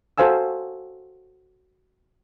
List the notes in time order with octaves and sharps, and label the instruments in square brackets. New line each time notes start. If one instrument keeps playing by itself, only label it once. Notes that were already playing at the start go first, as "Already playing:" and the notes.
[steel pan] F#4 A4 C5 F5 G#5 E6